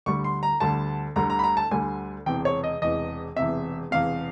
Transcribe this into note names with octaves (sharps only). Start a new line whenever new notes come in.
D2 D3 G3 C#6
C6
A#5
D2 D3 G3 A5
D2 D3 G3 A#5
A#5
B5
A#5
A5
D2 D3 G3 G#5
E1 E2 C3 G5
C#5
D#5
E1 E2 C3 D#5
E1 E2 C3 E5
E1 E2 C3 F5